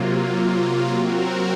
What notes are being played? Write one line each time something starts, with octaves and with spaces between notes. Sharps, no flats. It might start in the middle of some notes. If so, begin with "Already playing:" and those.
Already playing: C3 F#3 A#3 F4
F#3 C4 F#4 A#4